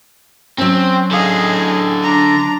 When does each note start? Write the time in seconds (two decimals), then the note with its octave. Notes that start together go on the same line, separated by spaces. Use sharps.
0.58 F#3 C4 C#4
1.11 D3 G#4 D#5 F5
2.02 D4 A#5